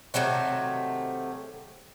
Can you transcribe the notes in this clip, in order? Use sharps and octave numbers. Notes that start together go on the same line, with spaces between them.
C3 D#3 F#3 A3